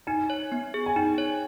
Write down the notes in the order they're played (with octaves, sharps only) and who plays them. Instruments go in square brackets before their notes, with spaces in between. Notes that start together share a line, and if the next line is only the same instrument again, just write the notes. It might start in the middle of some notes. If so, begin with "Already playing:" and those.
[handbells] D#4 [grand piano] G#5
[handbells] C#5
B3
G#4
[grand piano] G#5
[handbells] D#4 [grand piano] G5
[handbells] C#5